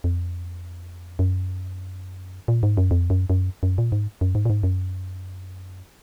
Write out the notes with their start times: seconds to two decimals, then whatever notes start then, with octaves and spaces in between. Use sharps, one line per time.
0.04 F2
1.19 F#2
2.48 A#2
2.63 G#2
2.77 F#2
2.91 F2
3.10 F#2
3.30 F#2
3.63 F#2
3.78 A#2
3.92 G#2
4.21 F#2
4.35 G#2
4.45 A#2
4.50 G#2
4.63 F#2